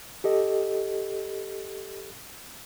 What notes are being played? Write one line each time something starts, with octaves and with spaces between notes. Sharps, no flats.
G4 A4 D#5